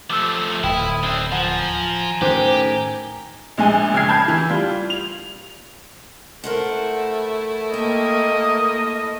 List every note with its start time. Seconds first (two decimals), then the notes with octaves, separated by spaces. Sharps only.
0.10 F3 A3 D6 E6 F6
0.64 D1 E4 G5 D#6 F6
1.03 C4 D4
1.32 F3 F#5 G#5 A#5
2.21 A2 D#3 C#4 G4 C5 D6
3.57 A#1 G#3 G#5
3.94 F#1 G5 F6 G#6 C7
4.09 A5 B5 G6
4.28 E3
4.49 G3 F4
4.90 F7
6.44 A3 E4 A#4 C5 F#5
7.73 A#3 D#5 G5